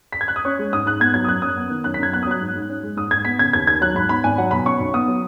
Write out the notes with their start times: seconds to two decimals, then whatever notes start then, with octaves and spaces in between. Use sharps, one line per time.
0.12 B6
0.21 G#6
0.28 F#6
0.36 D#6
0.45 C#4 C#6
0.59 G#3
0.72 G#2 D#6
0.86 G#2 F#6
1.00 B3 G#6
1.14 F#3 G#6
1.24 D#6
1.28 F#2 F#6
1.42 F#2 D#6
1.57 B3
1.70 D#3
1.84 F#2 F#6
1.94 B6
1.99 F#2 G#6
2.13 B3 F#6
2.23 D#6
2.27 F#3 F#6
2.41 G#2
2.55 G#2
2.70 C#4
2.83 G#3
2.97 G#2 D#6
3.11 G#2 G#6
3.25 B3 B6
3.39 C#3 G#6
3.53 D#2 G#6
3.67 D#2 G#6
3.81 F#3 F#6
3.95 G#2 B5
4.09 B3 B5
4.24 G#1 G#5
4.38 F#3 F#5
4.51 B2 B5
4.66 C#4 C#6
4.80 B1
4.94 B3 D#6
5.08 F#3